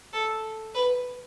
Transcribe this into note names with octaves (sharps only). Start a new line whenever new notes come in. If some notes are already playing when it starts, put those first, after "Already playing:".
A4
B4